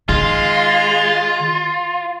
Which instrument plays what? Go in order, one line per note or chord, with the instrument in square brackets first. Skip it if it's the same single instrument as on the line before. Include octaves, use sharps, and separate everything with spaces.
[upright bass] D#3 [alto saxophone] G#3 [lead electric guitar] F4